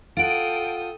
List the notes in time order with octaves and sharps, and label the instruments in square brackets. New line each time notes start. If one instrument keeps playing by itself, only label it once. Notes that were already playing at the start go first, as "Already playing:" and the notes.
[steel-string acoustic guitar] F4 F#5 [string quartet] A4 G5 D#6 [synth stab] D7